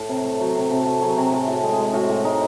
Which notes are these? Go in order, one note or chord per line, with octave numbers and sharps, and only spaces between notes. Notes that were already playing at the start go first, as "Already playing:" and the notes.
Already playing: A2 A4
C3
A3
F#3
C3
C3 A4
A3
F#3 G#4
C3
A2 G#4
A2
A4
G#3
G#4
G#3
A2 F#4
A2
G#3 D#4